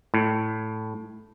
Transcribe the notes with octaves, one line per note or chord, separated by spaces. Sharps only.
A2